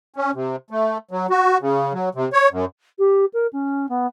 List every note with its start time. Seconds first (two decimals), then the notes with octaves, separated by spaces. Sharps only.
0.16 C#4
0.34 C3
0.71 A3
1.11 F#3
1.30 F#4
1.61 C#3
1.93 F#3
2.15 C3
2.33 C#5
2.51 F#2
2.99 G4
3.33 A#4
3.53 C#4
3.89 B3